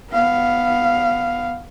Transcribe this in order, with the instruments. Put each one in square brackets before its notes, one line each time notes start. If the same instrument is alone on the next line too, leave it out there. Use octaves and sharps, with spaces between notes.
[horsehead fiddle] B3 F5